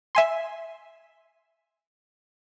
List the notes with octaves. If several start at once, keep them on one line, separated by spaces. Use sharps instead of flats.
E5 G#5 C6